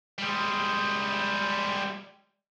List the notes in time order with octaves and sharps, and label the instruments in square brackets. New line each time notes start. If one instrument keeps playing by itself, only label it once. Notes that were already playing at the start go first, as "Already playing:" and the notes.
[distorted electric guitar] G3 G#3